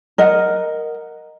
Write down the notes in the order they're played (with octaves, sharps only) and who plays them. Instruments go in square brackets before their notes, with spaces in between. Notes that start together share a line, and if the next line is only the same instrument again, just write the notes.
[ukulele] A#4 D#5 F#5